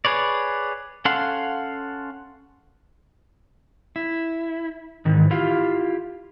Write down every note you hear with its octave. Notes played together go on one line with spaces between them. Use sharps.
G#4 B4 C#5 D5
C#4 A4 F5 F#5 C6
E4
G#2 D#3 E3
E4 F4 G4 F5